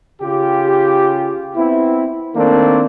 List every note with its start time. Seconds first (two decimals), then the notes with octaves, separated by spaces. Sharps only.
0.22 C#3 F4 G4
1.56 B3 C4 E4
2.36 D#3 A3 A#3 C4 D4